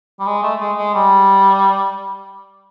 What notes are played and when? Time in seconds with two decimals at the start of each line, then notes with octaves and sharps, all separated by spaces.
0.19 G3
0.26 G#3
0.42 A3
0.60 G#3
0.77 G#3
0.94 G3